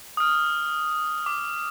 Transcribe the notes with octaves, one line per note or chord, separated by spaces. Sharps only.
D#6 F6
D6